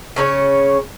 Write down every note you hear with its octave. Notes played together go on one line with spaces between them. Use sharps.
C#3 C#4 A4 C#5